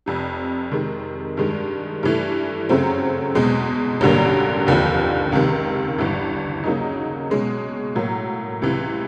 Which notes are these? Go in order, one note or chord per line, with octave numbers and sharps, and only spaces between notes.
F1 F2 C3
C3 D#3 G#3
G2 D#3 G#3
G2 E3 A3
F#2 C#3 F#3 A3 C4
E2 B2 G#3
A1 G2 D3 F#3 A#3
F1 D#2 D3 F3
C#2 C3 D#3
G1 G2 E3
C#3 F#3 A#3 D#4
B2 G#3 C#4
A2 F#3 A#3
C#2 C3 E3